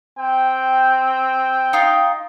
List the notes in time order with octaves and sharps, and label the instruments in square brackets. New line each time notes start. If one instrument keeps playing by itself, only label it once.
[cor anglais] C4 [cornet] G5
[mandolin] D#4 F4